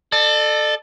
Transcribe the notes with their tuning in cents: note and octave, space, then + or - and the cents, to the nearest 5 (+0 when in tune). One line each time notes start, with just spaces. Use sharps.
A4 +0 D5 +45